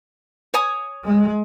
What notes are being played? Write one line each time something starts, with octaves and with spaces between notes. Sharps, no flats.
C#5 G#5 D#6
G#3